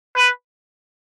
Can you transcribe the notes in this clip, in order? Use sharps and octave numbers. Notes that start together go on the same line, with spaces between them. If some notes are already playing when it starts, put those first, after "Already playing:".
B4